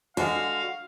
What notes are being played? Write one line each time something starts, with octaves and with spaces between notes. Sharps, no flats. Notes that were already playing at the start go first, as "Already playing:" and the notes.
D3 G#3 F#4 F5